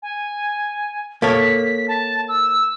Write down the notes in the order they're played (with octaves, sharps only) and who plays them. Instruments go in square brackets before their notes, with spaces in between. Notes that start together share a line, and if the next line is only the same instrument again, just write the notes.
[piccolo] G#5
[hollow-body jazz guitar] A#3 A4 C#5 [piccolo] B6
[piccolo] A5
E6